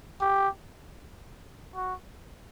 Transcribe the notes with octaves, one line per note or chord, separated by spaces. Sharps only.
G4
F#4